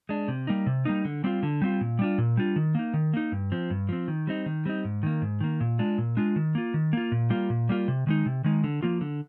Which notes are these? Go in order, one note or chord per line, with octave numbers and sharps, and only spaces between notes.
G#3 D4
C3
G3 A#3 D#4
C3
G3 A#3 D#4
D3
G3 C4 F4
D3
G3 C4 F4
A#2
G3 D4 F4
A#2
G3 D4 F4
D#3
A#3 D#4
D#3
A#3 D#4
G2
F3 C4
G2
F3 C4
D#3
G3 C4 D#4
D#3
G3 C4 D#4
G#2
D#3 A#3
G#2
D#3 A#3
A#2
G#3 D4 F4
A#2
G#3 D4 F4
D#3
A#3 F4
D#3
A#3 F4
A#2
G3 A#3 F4
A#2
G3 A#3 F4
C3
D#3 G#3 D#4
C3
D#3 G#3 D#4
D3
F3 A#3 F4
D3